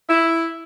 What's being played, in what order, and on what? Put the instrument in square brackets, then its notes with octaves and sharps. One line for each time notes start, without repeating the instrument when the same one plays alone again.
[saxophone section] E4